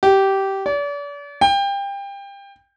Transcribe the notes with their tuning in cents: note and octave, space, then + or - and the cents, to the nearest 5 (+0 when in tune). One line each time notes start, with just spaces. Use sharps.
G4 -15
D5 -40
G5 +25